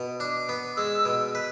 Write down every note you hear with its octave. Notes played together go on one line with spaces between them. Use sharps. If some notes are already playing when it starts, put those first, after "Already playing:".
Already playing: B2
D4
B3
G#3 E6
B2
B4